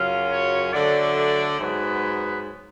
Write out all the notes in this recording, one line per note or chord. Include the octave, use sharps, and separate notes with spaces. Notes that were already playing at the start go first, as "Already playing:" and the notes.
Already playing: F#2 C#3 F#3 C#4 F4 F5
C#5
D3 F#3 A3 D5
D5
G#2 F#3 B3 B4